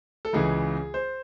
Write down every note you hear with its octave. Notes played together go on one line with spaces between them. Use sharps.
A4
C#2 C#3 E3 G#4
C5